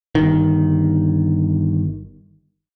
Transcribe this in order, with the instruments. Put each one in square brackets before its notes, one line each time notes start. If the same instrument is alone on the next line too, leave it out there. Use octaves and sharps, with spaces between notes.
[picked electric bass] G1 D#3